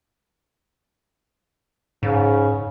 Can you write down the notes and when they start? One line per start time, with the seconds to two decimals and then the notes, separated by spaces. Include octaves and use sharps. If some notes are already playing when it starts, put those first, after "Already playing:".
2.03 G#2 C#3